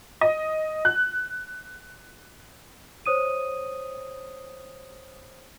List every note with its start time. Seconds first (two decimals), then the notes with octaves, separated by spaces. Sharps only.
0.21 D#5
0.85 F#6
3.06 C5 C#5 D#6 D#7